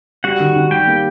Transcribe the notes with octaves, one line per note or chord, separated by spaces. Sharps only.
G3 F#4 F#5
D#3
D#3
G3 G4 G5
A#3